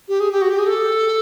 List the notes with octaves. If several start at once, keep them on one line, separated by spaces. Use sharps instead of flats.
G4
G#4
G4
F#4
G4
G#4
A4